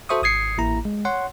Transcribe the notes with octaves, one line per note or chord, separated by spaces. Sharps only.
F#4 A4 C5 E5 C#6 D#6
G#1 D#6 G#6 C7 C#7
A1 A#3 E4 A#5
G#3
C#5 F#5 C6